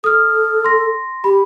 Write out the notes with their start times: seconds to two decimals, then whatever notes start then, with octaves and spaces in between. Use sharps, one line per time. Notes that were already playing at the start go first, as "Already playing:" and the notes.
0.04 A4 D#6 F6
0.64 C6 A#6
1.24 G4 B5